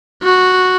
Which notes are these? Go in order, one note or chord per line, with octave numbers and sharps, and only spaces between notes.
F#4